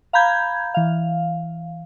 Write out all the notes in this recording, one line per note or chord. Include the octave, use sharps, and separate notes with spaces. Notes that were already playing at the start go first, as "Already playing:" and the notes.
F5 A#5 B5 G6 G#6
E3 F5